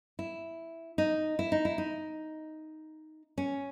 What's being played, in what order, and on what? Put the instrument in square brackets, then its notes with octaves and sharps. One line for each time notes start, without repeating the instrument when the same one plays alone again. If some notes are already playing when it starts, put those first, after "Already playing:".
[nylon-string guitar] E4
D#4
E4
D#4
E4
D#4
C#4